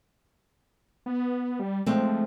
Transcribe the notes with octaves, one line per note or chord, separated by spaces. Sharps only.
B3
G3
F3 G#3 A3 C4